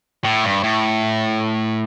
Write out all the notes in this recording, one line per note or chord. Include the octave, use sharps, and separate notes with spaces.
A2
G2
A2